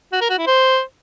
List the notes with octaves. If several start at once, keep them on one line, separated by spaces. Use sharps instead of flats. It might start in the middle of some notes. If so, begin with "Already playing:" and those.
F#4
A#4
F#4
E4
C5